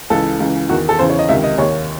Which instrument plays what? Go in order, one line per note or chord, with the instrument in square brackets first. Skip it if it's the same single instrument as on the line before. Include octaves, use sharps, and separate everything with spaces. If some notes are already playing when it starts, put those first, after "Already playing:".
[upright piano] C#2 C#3 E3 A4
C#2 C#3 E3
E2 D#3 F#4
A4
E2 C#3 E3 C5
C#5
D#5
C#2 C3 D#3 E5
D#5
D#2 D#3 C#5